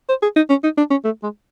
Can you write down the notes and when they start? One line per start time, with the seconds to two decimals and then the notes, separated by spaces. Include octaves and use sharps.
0.09 C5
0.22 G#4
0.36 D#4
0.50 C#4
0.64 D#4
0.77 D4
0.90 C#4
1.04 A3
1.23 G#3